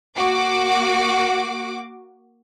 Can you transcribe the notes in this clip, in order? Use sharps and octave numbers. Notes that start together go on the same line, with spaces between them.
A#3 F#4 D6